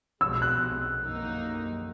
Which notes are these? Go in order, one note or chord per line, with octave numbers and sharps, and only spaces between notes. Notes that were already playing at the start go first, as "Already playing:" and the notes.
B1 B2 G#3 E6
F#6
F#2 D#3 F#3 A#3 D#4